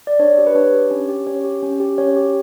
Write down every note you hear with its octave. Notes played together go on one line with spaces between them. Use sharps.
D5
D4 C#5
G4
B4
D4 C#5
G4
C#4
G4
C#4 C#5
G4
C#4
G4
C#4 C#5
G4